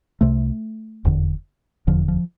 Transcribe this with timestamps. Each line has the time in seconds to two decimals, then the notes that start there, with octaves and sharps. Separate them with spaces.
0.21 C2 C3 A3
1.05 F1 E2 D3
1.87 F1 E2 D3 F3
2.08 F3